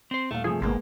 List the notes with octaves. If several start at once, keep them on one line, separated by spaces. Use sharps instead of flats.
C4 C5
D#1 A3 F5
G2 C3 F3 A3 G#4
G#1 G#3 A#3 B3